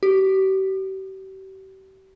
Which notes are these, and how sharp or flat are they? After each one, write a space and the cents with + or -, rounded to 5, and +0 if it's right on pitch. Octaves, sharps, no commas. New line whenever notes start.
G4 -40